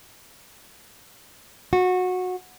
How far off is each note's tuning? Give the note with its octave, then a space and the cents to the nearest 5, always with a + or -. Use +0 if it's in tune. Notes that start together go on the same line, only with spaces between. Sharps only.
F#4 -20